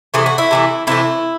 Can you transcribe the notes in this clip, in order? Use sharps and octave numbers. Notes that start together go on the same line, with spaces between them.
C3 E3 A3 G#4
F#4
E4
C3 E3 A3
C3 E3 A3 E4